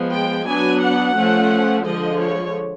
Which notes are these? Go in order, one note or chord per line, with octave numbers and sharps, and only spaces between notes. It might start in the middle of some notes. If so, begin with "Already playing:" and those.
Already playing: F3 G#3 B3
G5
F#3 B3 D4 G#5
F#5
F3 A3 C#4
D3 F3 G#3 D#5
C#5